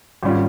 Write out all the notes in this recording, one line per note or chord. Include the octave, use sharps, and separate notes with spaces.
G#1 G3 C#4 F4